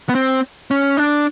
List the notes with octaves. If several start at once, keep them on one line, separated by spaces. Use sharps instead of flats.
B3
C4
C#4
D4